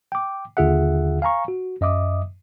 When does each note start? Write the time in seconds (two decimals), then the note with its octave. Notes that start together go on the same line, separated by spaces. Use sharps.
0.12 G5 D6
0.57 D#2 D3 F4 G#4 E5 F#5
1.22 F5 G#5 A#5 C#6
1.48 F#4
1.81 F#2 D#5 E5 D6 D#6